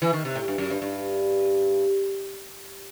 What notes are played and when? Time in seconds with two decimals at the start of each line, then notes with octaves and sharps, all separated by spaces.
0.02 E3
0.13 D#3
0.25 C3
0.35 A2
0.48 G2
0.58 F#2
0.70 G2
0.82 G2